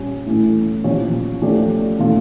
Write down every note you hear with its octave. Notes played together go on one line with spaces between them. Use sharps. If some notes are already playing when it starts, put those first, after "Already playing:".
Already playing: A#2 G3 C#4
A2 E3 A3 C#4
A#2 F3 C#4 G4 C#5
F3 A3 C#4 G4 D5
A#2 F3 A3 C#4 F4